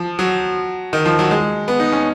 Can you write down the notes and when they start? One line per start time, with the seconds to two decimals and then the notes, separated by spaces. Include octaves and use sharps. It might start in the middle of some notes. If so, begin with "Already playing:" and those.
Already playing: F3
0.19 F#3
0.93 D#3
1.06 F3
1.19 F#3
1.31 G#3
1.68 B3
1.80 D#4
1.92 C#4